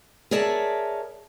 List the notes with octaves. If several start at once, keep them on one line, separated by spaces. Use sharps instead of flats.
G#4 A#4 C#5 D5 E5 A5